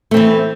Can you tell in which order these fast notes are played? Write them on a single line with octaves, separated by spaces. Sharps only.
A3 C4 E3